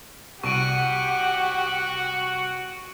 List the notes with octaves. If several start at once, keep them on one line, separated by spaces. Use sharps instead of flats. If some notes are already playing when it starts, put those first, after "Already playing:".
C2 F#4 G4 F#5 C#6 D7 D#7